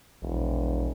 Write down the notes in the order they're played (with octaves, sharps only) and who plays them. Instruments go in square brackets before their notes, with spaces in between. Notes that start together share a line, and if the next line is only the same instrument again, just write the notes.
[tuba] E1 [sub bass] A#1